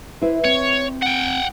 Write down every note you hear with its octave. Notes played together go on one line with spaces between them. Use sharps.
E4 B4 C5
C4 C#5
F#5 G5